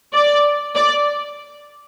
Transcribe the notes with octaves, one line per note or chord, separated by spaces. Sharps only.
D5
D5